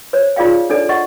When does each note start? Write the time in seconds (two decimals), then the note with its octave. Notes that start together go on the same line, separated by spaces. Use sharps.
0.13 C5 C#5
0.36 D#4 F4 G#4 D5 F5 G5
0.70 D4 D#4 A4 C#5 D5
0.89 D#5 F#5 C#6